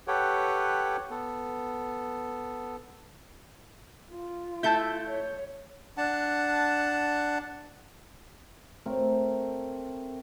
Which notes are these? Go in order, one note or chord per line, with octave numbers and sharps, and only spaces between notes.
G4 A4 B4 C#5 F#5 G5
B3 A4
F4
A3 E4 A5 G6
C#5
D4 F#5 A5
A3 C4 A4 A#4